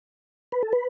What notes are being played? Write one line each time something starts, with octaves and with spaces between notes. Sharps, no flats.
B4
A4
B4